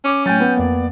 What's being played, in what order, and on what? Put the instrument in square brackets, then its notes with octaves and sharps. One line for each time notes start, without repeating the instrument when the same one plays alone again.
[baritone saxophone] C#4 [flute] D6
[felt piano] A2 A6 [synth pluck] F#3 G5 G#5 [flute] G6
[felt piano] B3
[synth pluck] F2 A#3 [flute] D5